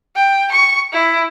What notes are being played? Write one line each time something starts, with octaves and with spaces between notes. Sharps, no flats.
G5
C#6
E4